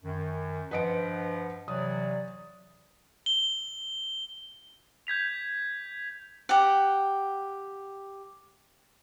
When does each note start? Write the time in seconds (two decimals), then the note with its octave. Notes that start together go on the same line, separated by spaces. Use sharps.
0.04 F#2 D#3
0.71 G2 F3 B4 D#5 F#5 D7
1.68 C3 E3 F#3 D5 D#6
3.26 G7
5.07 G6 G#6 B6 F7
6.49 G4 F#5